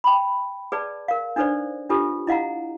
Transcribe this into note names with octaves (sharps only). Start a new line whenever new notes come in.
G5 B5
G#4 B4 D5 A5
A#4 F5
D4 D#4 A4 B4 C5 D5
D4 F4 G4 A4 B4
E4 D#5 F5 F#5 A#5